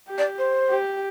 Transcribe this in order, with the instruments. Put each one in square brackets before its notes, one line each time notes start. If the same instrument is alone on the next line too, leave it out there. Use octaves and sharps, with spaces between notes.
[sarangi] G4
[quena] D5
C5
[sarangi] G4